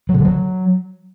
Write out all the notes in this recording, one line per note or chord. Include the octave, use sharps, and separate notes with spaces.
F#3
C3
D3
F#3